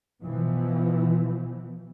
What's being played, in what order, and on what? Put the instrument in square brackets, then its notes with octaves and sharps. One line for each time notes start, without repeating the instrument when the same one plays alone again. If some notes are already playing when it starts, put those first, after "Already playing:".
[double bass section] B2 E3 F3